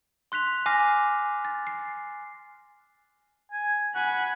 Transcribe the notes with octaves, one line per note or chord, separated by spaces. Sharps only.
C6 F#6 B6 F7
G#5 D6 F6 A#6 C7
A6
C7
G#5
F#5 G#5 B5